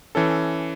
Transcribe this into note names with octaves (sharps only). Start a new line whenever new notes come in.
E3 C#4 A4